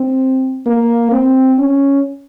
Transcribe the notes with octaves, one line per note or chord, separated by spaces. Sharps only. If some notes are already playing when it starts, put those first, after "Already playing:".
Already playing: C4
A#3
C4
C#4